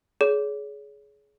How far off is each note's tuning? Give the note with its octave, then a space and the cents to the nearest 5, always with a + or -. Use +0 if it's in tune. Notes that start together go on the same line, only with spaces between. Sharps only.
G#4 +25 C#5 +30